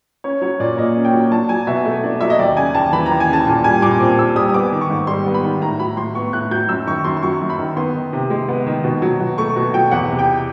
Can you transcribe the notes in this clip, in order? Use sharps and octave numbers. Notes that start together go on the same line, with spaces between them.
C#4 C#5
F#3 C#5
A#2 D5
A#3 D#5
C#4
G5
F#3
D4 A5
F#3 G#5
B2 E5
A3
D4
F#3 E5
D#5
D#2 D5
C#3 G#5
D#2 A5
E3 B5
A#5
D#2
G#5
C#3 A5
A#2 A5
G3 G#5
A#2 D6
C4 D6
A#2 E6
G3 D#6
D#6
B3 D6
D#3
C#6
G#2
G3 C6
B3
B5
D#3
A2 A#5
F#3 B5
A2 C6
B3 C#6
A2 F#6
F#3 G6
F#2 E6
D#3 C#6
F#2 C6
C6
F#3 C#6
F#2
B5
D#3
B3 C6
D#3
C3
G#3
B3
D#3
B2
F#3
B2
A3 C#6
B2
F#3 G5
E2 F#5
C3
G5